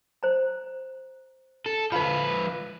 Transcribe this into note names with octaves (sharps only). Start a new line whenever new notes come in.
C5 A#5
A4
F3 D#4 B4 F5 B5